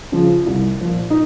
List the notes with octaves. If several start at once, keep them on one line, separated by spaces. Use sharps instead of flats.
C#3 F3
C2
A#2 F3
D#4